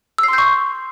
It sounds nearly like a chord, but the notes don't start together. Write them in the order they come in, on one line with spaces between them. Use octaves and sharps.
E6 C7 C6 G6 C#6